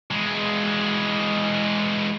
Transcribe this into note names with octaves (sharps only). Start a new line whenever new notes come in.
E3 G#3